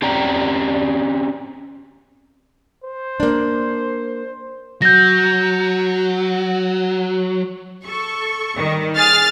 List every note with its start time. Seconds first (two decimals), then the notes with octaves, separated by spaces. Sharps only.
0.02 C4 C#4 G4 D5 G5 A#5
2.84 C5
3.20 A#3 D4
4.82 F#3 G6 A#6
7.85 A4 C#6
8.55 D#3 G3
8.97 G#4 F6 A6